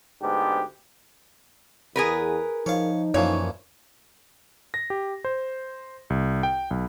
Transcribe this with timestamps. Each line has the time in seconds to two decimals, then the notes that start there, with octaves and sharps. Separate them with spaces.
0.22 D2 G#2 B3 D4 G4
1.96 E2 G#4 A#4 B4
2.66 F3 D#4 C#5 F5
3.14 F#2 A#2 E3 F3 C#5
4.74 A#6
4.90 G4
5.25 C5
6.10 C2
6.43 G5
6.71 B1